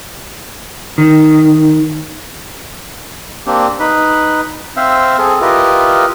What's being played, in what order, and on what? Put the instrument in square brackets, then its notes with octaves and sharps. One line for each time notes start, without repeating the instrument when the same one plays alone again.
[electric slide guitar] D#3
[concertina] A#3 C4 D4 G4
D#4 B4 B5
C4 C5 E5 F5
C4 G#4 A4
E4 F4 G4 A#4 B4 D#5